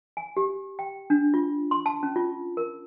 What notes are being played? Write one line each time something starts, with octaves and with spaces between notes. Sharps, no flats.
G#5
G4
G5
D4
F4
C6
A5
C#4
F4
A#4